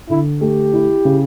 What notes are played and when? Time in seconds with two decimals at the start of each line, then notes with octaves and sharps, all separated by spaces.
0.09 D3 E4
0.41 A3 G4
0.73 E4
1.05 C#3